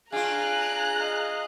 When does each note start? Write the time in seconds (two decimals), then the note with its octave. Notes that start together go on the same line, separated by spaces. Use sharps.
0.12 D4 F4 G#4 F5 G#5 A#5 F#6
1.00 D#5 F5